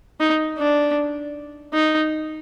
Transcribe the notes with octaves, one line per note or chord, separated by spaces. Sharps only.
D#4
D4
D#4